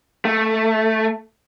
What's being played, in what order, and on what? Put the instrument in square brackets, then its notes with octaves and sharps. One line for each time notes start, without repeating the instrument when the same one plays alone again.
[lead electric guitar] A3